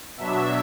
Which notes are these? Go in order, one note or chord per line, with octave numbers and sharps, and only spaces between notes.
B2 F#3 D4 E5